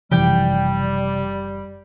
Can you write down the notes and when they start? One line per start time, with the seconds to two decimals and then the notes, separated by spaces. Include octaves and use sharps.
0.12 F#1 C3 E3 F3 G3 G4 G5